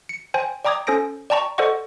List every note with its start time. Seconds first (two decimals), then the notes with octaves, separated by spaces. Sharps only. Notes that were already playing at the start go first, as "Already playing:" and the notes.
0.09 C#7
0.34 C5 G5 G#5
0.65 D5 G5 A#5 D6 D#6 G#6
0.87 C#4 A4 C5 D#6 A#6 D7
1.30 D5 G5 A5 A#5 C#6
1.58 A4 C5 D5 D#5 F#5 C#6